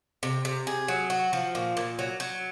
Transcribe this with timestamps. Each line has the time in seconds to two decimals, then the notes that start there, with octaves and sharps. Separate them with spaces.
0.23 C3
0.45 C3
0.67 G#4
0.88 F#3
1.10 F#4
1.33 F3
1.55 A#2
1.77 A#2
1.99 F#3
2.20 F#3